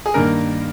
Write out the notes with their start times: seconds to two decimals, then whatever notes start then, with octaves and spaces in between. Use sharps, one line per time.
0.06 G#4
0.14 G2 D#3 A#3 A#4